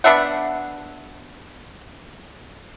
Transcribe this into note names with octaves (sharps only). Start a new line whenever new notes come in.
B3 D4 E5 F#5